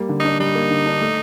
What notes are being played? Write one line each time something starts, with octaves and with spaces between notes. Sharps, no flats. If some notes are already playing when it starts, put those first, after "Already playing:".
Already playing: G3 A#3
D3
D4 D#4
G3 D#4
A#3
D3
D4
A3